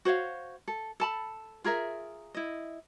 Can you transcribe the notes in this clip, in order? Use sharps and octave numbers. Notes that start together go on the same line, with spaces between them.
F#4 C5 C#5 F5
A4
A4 A5 B5
F4 G#4 A#4 E5
E4 D#5